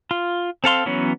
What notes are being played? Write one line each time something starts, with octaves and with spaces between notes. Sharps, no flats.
F4
C4 A4 F5 C6
E3 F#3 B3 C#4